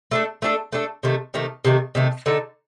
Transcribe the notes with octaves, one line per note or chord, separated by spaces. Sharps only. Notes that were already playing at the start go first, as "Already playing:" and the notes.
A3 D4 A4
A3 D4 A4
A3 D4 A4
C3 D#3 A3
C3 D#3 A3
C3 D#3 A3
C3 D#3 A3
D3 A3 D#4 A4